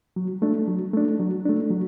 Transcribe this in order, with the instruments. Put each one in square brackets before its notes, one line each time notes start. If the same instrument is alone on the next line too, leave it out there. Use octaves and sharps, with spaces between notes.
[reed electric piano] F#3
A3 D4
F#3
A3 D4
F#3
A3 D4
F#3